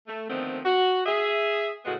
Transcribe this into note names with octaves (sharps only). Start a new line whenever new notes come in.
A3
D3 D#3 F3 A3 B3 C4
F#4
G#4 E5
A2 C#3 G#3 B3 F#4